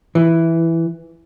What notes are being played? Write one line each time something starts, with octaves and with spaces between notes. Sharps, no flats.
E3